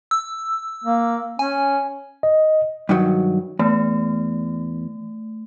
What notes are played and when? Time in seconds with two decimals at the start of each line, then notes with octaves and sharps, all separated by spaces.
0.11 E6
0.84 A#3
1.39 C#4 G#5
2.23 D#5
2.89 G2 D#3 F#3
3.59 E2 A3